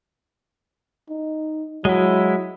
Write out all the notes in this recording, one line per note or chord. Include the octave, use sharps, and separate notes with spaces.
D#4
F#3 G#3 E4